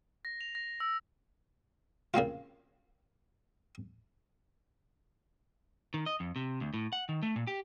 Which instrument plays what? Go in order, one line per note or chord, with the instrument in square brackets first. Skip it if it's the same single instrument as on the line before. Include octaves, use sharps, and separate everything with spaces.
[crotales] A#6
F7
A#6
E6
[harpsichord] C#3 A#3 C4 F4
[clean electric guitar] D#3
D#5
F2
C3
D2
A2
F#5
D#3
A3
A#2
G4